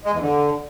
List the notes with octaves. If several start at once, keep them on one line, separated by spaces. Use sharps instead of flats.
G#3
E2
D3